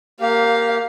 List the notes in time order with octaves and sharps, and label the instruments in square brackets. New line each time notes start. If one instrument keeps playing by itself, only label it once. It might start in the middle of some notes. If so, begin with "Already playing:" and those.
[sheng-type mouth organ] A#3 G4 [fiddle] F5